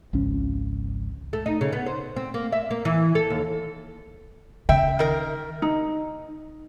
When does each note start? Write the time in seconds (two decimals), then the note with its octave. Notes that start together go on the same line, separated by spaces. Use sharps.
0.13 G#1 C#2 F3 C#4
1.33 A3
1.46 D#4
1.61 C#3
1.73 B3
1.86 C5
2.16 C4
2.34 A#3
2.52 E5
2.71 A#3
2.85 E3
3.15 A4
3.30 D#2
4.69 C#3 E5 G5
4.99 D#3 A#4
5.62 D#4